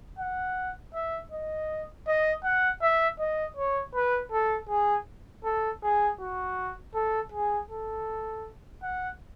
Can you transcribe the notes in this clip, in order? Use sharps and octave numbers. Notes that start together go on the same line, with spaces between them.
F#5
E5
D#5
D#5
F#5
E5
D#5
C#5
B4
A4
G#4
A4
G#4
F#4
A4
G#4
A4
F#5